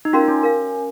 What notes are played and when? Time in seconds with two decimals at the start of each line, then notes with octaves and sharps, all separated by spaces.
0.05 D#4
0.13 C#4 F4 F#4 A#4 F5 C6
0.28 C#4
0.43 A#4 F5